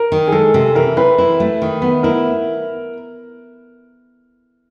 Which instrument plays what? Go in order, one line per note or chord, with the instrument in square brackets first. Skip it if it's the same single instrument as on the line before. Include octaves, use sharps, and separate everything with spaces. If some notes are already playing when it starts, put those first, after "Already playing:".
Already playing: [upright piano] A#4
[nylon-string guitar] D#3
[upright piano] G#4
[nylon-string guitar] G#3 [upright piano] A4
[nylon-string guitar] C3
[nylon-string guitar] E3 [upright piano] A#4
[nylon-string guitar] C4 [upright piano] B4
[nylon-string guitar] E4
A3
D#3
B3
[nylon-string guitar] E4 [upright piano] A#4